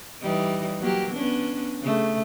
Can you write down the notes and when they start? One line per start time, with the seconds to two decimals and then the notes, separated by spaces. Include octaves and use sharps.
0.22 E3 G3 D#4
0.80 F#3 A#3 G4
1.14 B3 C#4 D4
1.83 C#3 A3